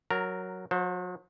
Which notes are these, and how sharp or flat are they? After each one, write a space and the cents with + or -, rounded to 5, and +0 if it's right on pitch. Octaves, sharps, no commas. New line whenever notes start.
F#3 +0 A#4 +0 A#5 -30
F#3 -40 C5 +5